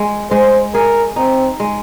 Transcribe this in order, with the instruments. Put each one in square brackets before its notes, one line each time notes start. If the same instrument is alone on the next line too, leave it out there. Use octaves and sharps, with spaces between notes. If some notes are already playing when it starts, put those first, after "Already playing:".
Already playing: [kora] G#3
[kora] G#3 [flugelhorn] C5
[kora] G#4 [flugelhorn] A#4
[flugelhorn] C4 [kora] D#4
[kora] G#3